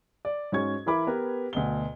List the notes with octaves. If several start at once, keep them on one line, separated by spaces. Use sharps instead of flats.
D5
G#2 C#4 F#4 C#6 G#6
E3 E4 A#4 B5 D6
B3 G4 A#4 B4
D2 B2 G7